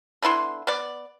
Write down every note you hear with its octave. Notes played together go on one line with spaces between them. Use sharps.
D3 B3 E4 C6
B3 D5